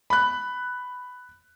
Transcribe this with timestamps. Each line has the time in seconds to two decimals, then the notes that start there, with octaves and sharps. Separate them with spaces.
0.10 B5 F#6